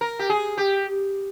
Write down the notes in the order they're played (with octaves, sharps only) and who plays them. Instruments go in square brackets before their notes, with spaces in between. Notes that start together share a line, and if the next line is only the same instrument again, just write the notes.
[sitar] A#4
G4
G#4
G4